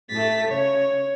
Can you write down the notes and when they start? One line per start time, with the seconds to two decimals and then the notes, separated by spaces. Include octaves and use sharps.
0.10 A2 A3 A6 B6
0.48 C#3 C#5